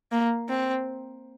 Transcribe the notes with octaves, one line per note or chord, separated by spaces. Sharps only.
A#3
C4